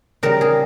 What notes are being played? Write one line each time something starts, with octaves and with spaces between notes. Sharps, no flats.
C#3 G3 A#4
G#4